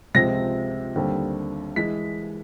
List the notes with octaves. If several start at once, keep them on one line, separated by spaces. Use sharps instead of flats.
C#2 C3 F3 G#3 C4 A#6
D#2 D3 G3 C4
E3 G#3 B6